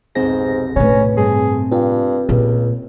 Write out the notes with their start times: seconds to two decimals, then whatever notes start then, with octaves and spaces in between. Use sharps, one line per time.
0.15 F1 B1 G#2 C4 A#6
0.76 A2 C3 C#4 B4 G#5
1.17 G2 A3 C4 G#4
1.72 G2 F4 G4
2.29 C#2 A#2